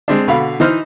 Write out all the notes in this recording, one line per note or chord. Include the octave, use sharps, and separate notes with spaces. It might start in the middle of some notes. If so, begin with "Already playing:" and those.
G#3 C4 D4
B2 D3 F5 B5
E3 D#4 C5 D#5 F6